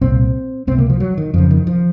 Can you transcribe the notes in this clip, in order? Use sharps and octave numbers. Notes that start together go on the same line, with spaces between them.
C2 A#2 C4
C#2 C3 C4
A#3
F3
F#3
D#3
F2 C#3 F3
D#3
F3